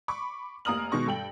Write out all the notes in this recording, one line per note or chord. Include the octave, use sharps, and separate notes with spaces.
B5 C#6 D6
F1 A#3 A#5 D#6 F6 F#7
B2 D#3 G#3 B3 C#6 A#6
G2 A4 G5 F#7